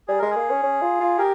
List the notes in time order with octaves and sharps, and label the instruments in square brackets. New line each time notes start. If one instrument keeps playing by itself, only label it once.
[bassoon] G3 [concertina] G#4
[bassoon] G#3 [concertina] A#4
[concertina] G#4
[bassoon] A#3
C#4
C#4
F4
F4
[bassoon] G4 [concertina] A#4